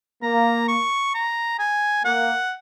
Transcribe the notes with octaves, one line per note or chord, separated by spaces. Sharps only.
A#3 A#5
C#6
A#5
G#5
A#3 F#5